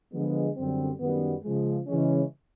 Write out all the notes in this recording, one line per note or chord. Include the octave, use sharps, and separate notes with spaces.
D3 F3 G#3 B3
F#2 D3 G3 C4
F#2 D#3 G3 B3
C#3 F3 G#3
C#3 E3 G#3 C#4